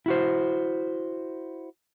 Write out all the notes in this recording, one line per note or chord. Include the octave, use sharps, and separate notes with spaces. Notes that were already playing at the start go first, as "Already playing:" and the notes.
E4 F#4 C5